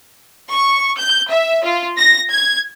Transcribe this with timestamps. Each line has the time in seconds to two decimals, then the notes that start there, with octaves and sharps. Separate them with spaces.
0.50 C#6
0.98 G6
1.31 E5
1.64 F4
1.97 A#6
2.31 G#6